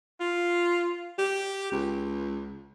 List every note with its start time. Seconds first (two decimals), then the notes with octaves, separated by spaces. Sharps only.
0.20 F4
1.18 G4
1.72 C#2